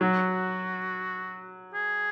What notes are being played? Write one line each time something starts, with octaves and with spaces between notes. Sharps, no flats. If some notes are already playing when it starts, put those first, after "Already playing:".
F#3 F#4
G#4